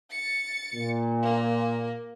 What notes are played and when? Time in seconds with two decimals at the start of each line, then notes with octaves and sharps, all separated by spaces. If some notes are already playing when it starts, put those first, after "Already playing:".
0.11 A6 C#7
0.74 A#2
1.22 A#3